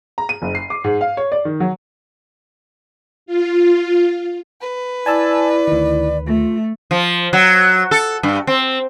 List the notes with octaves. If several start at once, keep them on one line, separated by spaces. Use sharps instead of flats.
A#5
D#7
F#1
C7
D6
G#2
F5
C#5
D5
D#3
F#3
F4
B4
E4 D5 G#5 A5 E6
D2 D#3
A3 F4
F3
F#3
A4
G2
C4